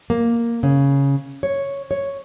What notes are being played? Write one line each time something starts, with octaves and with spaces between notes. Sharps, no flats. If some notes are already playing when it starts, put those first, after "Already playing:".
A#3
C#3
C#5
C#5